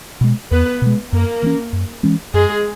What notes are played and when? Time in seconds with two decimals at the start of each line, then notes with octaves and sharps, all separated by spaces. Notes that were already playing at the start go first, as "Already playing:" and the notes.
0.21 B2 G#3
0.51 E2 B3 B4
0.82 B2 G#3
1.12 F#2 A#3 A#4
1.42 E3 G#3 C#4
1.73 F#2
2.03 E3 G#3 C#4
2.34 F#2 G#3 G#4